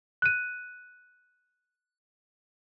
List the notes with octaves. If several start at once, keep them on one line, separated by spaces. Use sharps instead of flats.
F#6 D#7